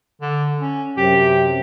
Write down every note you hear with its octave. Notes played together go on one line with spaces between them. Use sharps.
D3
C#4
F#2 C3 G4